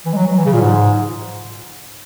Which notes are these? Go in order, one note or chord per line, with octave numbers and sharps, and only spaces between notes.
E3
G#3
F#3
F#3
E3
C#3
A#2
G#2